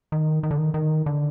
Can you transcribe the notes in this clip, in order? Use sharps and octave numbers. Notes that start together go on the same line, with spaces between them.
D#3
D#3
D3
D#3
D#3
D3